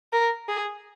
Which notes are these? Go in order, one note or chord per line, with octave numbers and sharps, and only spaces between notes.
A#4
G#4